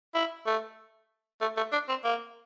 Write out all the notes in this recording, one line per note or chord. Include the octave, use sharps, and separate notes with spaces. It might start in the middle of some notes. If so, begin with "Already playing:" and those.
E4
A3
A3
A3
D4
C4
A#3